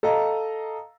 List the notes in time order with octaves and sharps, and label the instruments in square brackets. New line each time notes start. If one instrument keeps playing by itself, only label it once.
[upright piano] A4 D#5 F5 A#5